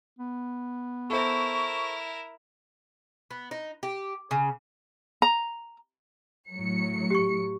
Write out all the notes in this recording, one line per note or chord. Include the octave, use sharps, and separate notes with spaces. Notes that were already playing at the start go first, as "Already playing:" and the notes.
B3
E4 A4 A#4 C5 C#6
B3
D#4
G4
C#3
A#5
A2 F#3 C#7
G4 C#6